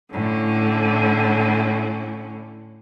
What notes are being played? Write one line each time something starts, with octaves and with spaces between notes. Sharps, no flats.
A2 D3 C#4